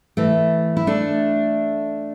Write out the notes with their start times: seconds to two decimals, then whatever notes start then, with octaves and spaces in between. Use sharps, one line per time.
0.17 E3 A3
0.77 E4
0.87 A3 D4